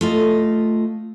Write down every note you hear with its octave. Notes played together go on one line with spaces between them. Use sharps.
A3 F4 D#5